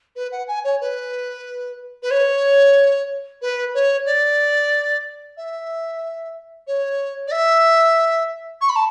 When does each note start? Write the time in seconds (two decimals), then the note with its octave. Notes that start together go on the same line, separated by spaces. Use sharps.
0.16 B4
0.32 F#5
0.47 G#5
0.64 C#5
0.81 B4
2.02 B4
2.10 C#5
3.41 B4
3.74 C#5
4.05 D5
5.37 E5
6.67 C#5
7.27 D5
7.31 E5
8.61 C#6
8.69 B5
8.75 A5